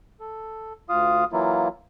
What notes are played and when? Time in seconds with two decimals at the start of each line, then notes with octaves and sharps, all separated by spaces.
0.20 A4
0.89 D2 F4 F5 D#6
1.33 E3 F#3 A#3 E4 F4